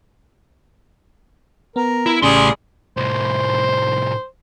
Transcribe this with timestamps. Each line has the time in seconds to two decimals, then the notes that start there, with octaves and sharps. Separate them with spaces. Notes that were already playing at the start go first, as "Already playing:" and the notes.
1.76 B3 A#4
2.06 E4
2.23 A1 A2 C#3 G3 G#4 C6
2.97 C2 A2 C5